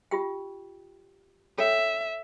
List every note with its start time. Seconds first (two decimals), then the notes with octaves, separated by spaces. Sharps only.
0.11 F4 G4 G5
1.58 A4 C#5 E5 G5